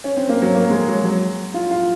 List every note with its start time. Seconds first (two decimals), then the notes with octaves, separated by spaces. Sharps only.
0.04 C#4
0.17 C4
0.29 A#3
0.42 F#3
0.54 A#3
0.70 G#3
0.88 F#3
1.04 F#3
1.54 F4
1.71 F4